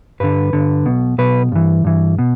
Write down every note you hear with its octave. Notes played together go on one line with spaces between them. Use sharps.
G2 D3 B4
G2 D3
B1 B2
B1 B2 B4
G2 E3
G2 E3
B2